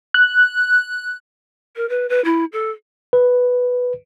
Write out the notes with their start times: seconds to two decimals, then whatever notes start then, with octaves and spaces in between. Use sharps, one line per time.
0.14 F#6
1.76 A#4
1.89 B4
2.09 B4
2.25 E4
2.53 A4
3.13 B4